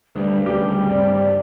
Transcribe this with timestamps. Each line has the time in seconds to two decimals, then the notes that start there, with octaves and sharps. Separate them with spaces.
0.16 D2 G2 G3
0.46 D1 D2 C#3 G3 G4
0.90 G2 C4 D5